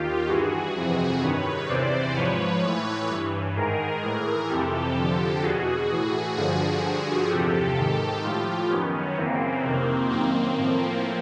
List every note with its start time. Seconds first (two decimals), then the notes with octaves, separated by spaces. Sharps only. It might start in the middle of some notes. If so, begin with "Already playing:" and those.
Already playing: D#2 D#3 F4 G4
0.28 G2 E3 F#4 G#4
0.75 F2 C3 E3
1.22 G2 D#3 B4 C#5
1.69 E2 C3 E3 C5 D5
2.15 G#2 F3 B4 C#5
2.63 A2 E3
3.09 G2 E3
3.56 G#2 D#3 G#4 A#4
4.03 A2 E3
4.49 F2 C3 E3 G4 A4
4.96 F2 D3 F3
5.42 E2 B2 F#4 G#4
5.89 A2 E3
6.36 G2 D3 F3 F#4 G#4
6.83 G2 D3 F3
7.30 E2 C3 F3 G4 A4
7.77 G#2 D#3
8.23 A2 F3 F4 G4
8.70 F#2 D#3 B3 C#4
9.17 F#2 C#3 E3 A#3 C4
9.63 F2 C3 D#3
10.10 F#2 D#3 A#3 C4
10.57 A2 F3